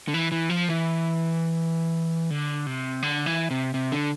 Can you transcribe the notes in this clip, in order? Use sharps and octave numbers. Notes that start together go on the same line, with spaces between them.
D3
E3
E3
F3
E3
D3
C3
D3
E3
C3
C3
D3